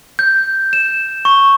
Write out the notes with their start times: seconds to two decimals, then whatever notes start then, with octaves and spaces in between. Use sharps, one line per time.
0.19 G6
0.73 E7
1.25 C#6